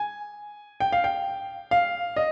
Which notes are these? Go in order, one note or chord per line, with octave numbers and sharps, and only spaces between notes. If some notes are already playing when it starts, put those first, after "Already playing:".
Already playing: G#5
G5
F5
G5
F5
D#5